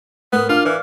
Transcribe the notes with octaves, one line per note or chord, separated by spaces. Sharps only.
A2 B3 A#4 D#6
D4 F4 D6 F6
E3 D5 F5